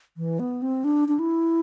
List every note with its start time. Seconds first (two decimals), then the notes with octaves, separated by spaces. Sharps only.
0.17 E3
0.39 B3
0.62 C4
0.84 D4
1.08 D4
1.19 E4